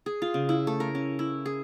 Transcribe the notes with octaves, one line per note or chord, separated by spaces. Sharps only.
G#4
F4
C#3
E4
A3
A#4
C#4
E4
G#4